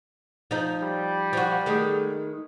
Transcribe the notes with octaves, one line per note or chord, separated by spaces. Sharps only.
F3 D#4
G3
F3 F#4
D#3 G#3 A3